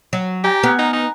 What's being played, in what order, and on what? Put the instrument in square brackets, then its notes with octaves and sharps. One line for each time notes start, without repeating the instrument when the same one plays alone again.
[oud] F#3
[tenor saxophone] G4 [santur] G5 G#5 A#5
[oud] B3 [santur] A#4 F#5 G#5
[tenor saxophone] D#4
D#4